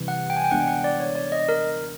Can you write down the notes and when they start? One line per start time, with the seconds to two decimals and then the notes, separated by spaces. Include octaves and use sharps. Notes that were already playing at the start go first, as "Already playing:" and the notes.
Already playing: C3 E3 G3
0.08 F#5
0.30 G5
0.37 G#5
0.44 G5
0.51 G#3 B3 D4 F#5
0.60 G5
0.68 F#5
0.84 D5
1.00 C#5
1.16 D5
1.32 D#5
1.49 A#4